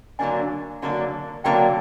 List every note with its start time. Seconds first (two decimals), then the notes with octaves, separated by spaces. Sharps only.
0.19 D3 F#3 A#3 D4 G#5
0.82 D3 F#3 A#3 D4
1.44 D3 F#3 A#3 D4 G5